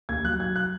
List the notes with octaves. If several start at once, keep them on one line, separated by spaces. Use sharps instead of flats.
D#2 G#6
F#3 F#6
F#3 G#6
F#6